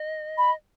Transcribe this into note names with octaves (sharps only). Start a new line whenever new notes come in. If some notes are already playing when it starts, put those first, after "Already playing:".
Already playing: D#5
B5